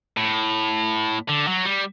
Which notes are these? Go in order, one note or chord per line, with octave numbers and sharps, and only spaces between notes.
A2
D3
F#3
G3